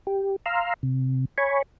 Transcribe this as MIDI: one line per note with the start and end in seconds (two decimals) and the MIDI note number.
0.07 0.36 67
0.46 0.73 77
0.46 0.73 82
0.46 0.73 84
0.46 0.73 88
0.46 0.73 89
0.83 1.25 48
1.38 1.62 73
1.38 1.62 80
1.38 1.62 83
1.38 1.62 85